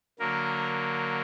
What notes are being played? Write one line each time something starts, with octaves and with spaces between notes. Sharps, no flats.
D3 F#3 A#3 A#4